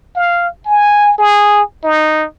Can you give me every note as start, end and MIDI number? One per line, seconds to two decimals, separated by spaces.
0.16 0.48 77
0.66 1.16 80
1.18 1.61 68
1.84 2.26 63